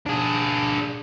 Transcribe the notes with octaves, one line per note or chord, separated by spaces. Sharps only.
D4 G#4